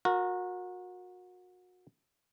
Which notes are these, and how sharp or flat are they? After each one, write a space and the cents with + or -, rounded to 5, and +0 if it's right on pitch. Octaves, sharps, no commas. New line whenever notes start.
F#4 -30 A#4 +0